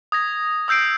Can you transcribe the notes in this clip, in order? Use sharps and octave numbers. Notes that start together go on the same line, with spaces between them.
D#6 G#6 A#6
D#6 E6 G6 C7 D7